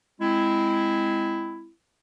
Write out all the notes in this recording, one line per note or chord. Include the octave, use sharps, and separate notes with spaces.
G#3 C4 E4